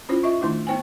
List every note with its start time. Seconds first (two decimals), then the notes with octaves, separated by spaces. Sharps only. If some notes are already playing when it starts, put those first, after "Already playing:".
0.09 C#4 E4 F4 C5
0.23 F4 D#5 E5 C#6
0.41 D#3 A3 D4 E4
0.67 B3 D#4 C5 G5 G#5